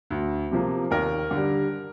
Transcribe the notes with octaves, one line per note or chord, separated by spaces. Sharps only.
D2
C3 F3 A#3
D#2 A#4
D3
G3